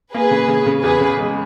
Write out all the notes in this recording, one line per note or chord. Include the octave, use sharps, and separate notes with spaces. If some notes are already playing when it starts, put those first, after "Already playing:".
A#3 G#4 B4
C#3
C#3
C#3
E2 G#4 B4
C#3
G#3